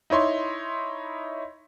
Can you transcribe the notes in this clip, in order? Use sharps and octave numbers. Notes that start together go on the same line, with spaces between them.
D#4 E4 C#5 C6